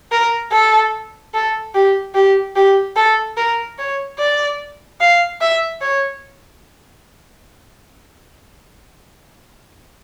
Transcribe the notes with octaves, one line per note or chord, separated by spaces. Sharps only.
A#4
A4
A4
G4
G4
G4
A4
A#4
C#5
D5
F5
E5
C#5